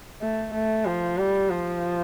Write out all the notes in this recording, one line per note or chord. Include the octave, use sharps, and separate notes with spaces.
A3
A3
F3
G3
F3